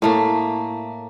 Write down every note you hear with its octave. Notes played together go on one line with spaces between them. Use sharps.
A2 A3 A#3